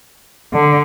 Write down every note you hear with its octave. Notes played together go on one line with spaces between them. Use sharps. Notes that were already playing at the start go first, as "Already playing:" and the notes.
D3